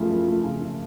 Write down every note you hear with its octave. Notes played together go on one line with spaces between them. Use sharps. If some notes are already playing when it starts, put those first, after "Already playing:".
Already playing: F#2 C#3 F3 A3 F4
F#2
A3
C#3
C#3